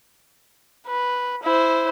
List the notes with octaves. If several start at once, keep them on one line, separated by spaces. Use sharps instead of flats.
B4
E4 C5